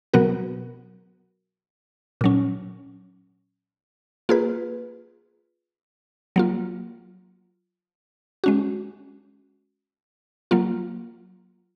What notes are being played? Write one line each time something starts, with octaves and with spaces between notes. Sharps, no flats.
B2 F#3 B3 F#4 A#4
A#2 F#3 C#4
A#3 F4 G#4 B4
F#3 A#3 F4
G#3 C#4 F#4
F#3 A#3 F4